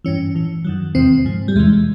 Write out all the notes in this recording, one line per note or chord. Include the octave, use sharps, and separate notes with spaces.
G2 E3 C#4
A2 E3
F#2 D#3 F#3
E2 C3 D#3 C4
G#2 F3
G3
E2 C3 E3 G#3